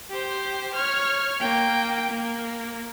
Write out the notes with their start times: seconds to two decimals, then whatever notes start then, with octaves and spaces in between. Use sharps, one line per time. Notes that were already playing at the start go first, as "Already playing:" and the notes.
0.10 G4 C5
0.75 C#5 F6
1.40 A#3 G5
2.11 A#3